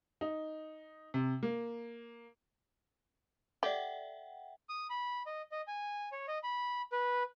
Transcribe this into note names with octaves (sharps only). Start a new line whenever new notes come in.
D#4
C3
A#3
G4 A4 D5 E5 F#5 G5
D#6
B5
D#5
D#5
G#5
C#5
D#5
B5
B4